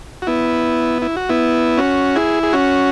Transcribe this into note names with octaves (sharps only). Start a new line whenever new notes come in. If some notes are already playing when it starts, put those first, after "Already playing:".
F#4
B3 E4
E4
F#4
B3 E4
C#4 F#4
E4 G#4
G#4
C#4 F#4